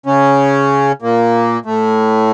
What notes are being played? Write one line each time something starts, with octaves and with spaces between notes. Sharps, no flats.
C#3 C#4
A#2 A#3
A2 A3